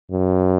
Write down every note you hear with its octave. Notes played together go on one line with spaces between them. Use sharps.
F#2